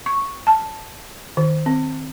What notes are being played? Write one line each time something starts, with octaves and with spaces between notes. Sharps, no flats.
C#6
A5
D#3
C4